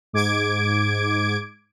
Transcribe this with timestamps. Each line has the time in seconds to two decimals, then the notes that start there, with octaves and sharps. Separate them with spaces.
0.13 G#2 D6 G#6 D7